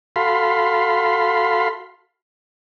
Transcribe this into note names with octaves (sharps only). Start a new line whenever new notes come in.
F#4 A4 F5 B5 C6